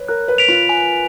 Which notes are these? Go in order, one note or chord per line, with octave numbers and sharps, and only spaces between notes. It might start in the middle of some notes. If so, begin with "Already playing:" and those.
Already playing: B4 C#5
A#4 F#6
B4
B6 D7 F7
F4
G#5